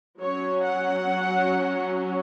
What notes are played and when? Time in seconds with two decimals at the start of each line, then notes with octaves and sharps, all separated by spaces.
0.22 F#3 C#4 C#5
0.65 F#5